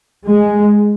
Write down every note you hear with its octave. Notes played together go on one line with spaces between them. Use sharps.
G#3